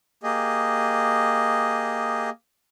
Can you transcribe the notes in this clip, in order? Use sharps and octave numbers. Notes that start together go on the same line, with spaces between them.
A#3 G4 G#4 D#5